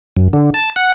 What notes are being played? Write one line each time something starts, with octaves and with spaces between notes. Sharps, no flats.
F#2
D3
A5
F#5